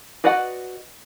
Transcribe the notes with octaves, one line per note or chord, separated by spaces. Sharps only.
F#4 B4 D5 D#5 F#5